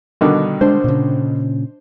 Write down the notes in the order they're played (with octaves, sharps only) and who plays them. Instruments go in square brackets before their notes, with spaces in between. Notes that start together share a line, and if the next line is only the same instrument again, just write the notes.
[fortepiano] B2 D3 D#3 [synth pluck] G3 D4
[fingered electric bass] G#3 [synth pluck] D4 C5
[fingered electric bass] A#2 C#3